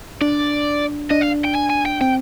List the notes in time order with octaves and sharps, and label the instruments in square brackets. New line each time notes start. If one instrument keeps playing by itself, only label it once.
[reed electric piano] D4 [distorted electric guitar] D5
[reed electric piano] D4 [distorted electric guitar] D#5
[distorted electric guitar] F5
G5
G#5
G#5
G5
[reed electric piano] C4 [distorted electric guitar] G5